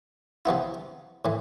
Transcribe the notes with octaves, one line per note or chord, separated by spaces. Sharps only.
C3 F3 B3 E4
A2 E3